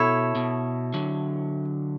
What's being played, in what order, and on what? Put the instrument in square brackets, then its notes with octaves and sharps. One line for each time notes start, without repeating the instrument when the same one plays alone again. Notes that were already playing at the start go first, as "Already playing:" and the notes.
Already playing: [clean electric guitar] B2 [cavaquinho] E4 A4 C#5
[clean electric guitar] B2
D3 F#3